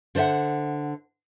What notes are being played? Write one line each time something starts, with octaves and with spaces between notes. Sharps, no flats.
D3 C5 D5 E5 F#5